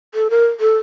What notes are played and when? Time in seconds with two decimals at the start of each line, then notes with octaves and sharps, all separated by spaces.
0.14 A4
0.30 A#4
0.60 A4